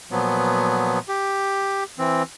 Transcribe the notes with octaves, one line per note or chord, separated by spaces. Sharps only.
A#2 F3 F#3 B3
G4
E3 C4